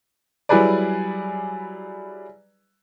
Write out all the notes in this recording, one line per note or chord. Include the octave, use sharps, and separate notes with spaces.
F#3 G3 E4 G#4 B4 D5